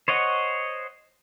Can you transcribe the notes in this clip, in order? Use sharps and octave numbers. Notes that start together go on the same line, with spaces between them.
C5 C#5 D#5 F#5